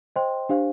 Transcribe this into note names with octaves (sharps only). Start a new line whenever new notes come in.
C5 D#5 G5 C6
D4 G4 C5 F5